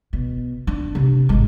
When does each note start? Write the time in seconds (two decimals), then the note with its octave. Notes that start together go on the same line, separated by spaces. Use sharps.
0.13 B2
0.67 D4
0.95 C3
1.29 G#1 G#3